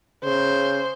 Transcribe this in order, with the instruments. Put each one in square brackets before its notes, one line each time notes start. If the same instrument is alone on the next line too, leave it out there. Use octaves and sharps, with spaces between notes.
[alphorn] C#3 [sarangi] C5